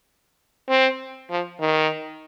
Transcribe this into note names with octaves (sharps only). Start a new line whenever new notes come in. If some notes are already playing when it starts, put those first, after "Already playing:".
C4
F3
D#3